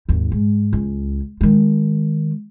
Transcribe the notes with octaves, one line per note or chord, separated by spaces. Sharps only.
G#1 D#2
G#2
C#2
D#3 G#3